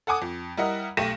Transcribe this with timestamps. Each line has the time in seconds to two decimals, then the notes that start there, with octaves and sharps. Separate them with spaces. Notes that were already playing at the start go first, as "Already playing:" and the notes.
0.07 A4 F#5 G#5 D6 D#6
0.22 F2
0.57 G3 E4 A#4 D#5 F#5
0.97 B1 A3 G4 A#6 D#7 E7